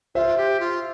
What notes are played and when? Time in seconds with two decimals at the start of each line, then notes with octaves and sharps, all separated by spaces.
0.15 F4 C5 E5
0.37 G4
0.60 F4